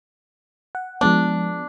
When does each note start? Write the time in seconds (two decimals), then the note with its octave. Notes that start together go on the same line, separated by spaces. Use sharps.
0.75 F#5
1.01 F3 G#3 B3 D4